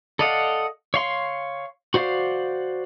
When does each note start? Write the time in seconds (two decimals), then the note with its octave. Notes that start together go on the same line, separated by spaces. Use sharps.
0.19 A4 D5 D#5 F5 F#5
0.94 C#5 F5 C6
1.94 F#4 C5 D5 F5